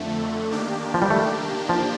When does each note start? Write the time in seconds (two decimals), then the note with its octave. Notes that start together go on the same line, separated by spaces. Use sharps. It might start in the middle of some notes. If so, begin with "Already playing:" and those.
Already playing: F2 D3 A3
0.51 D#3 A#3 D4 G4
0.94 F3
1.02 G3
1.10 A3
1.69 F3